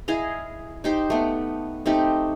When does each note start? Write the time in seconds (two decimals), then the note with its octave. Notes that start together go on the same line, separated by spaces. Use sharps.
0.08 E4 G#4 D#5 F5
0.84 D#4 G4 C5
1.10 A3 B3
1.86 A3 C4 D#4 G4